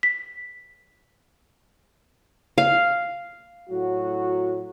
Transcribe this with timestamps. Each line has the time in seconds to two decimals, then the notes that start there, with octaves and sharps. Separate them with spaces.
0.03 B6
2.58 F5
3.70 A2 F#3 F#4